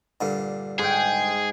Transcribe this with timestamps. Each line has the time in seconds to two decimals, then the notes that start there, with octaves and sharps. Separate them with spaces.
0.21 G2 A#2 D3
0.79 G#2 G#4 G5